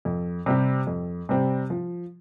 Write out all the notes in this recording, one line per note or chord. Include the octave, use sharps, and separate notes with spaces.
F2
C3 G3 C4 G4
F2
C3 G3 C4 G4
F3